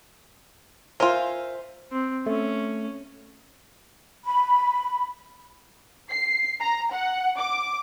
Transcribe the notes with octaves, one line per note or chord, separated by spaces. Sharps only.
F4 A#4 C5 E5 G#5
C4
A3 C#4
B5
C7
A#5
F#5
D6